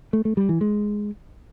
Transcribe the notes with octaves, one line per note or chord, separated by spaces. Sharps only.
A3
A3
G3
E3
G#3